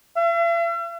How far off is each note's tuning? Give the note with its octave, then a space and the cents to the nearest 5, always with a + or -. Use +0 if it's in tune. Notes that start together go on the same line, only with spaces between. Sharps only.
E5 +45